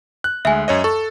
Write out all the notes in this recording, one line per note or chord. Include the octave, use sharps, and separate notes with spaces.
F#6
D2 G#3 E5 G#5
F#2 C#5 D#5
A4 C#6